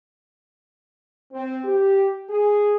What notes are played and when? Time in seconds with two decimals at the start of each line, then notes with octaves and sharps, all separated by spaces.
1.33 C4
1.64 G4
2.29 G#4